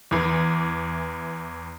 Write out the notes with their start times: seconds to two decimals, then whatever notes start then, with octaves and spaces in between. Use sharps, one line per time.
0.11 E2 E3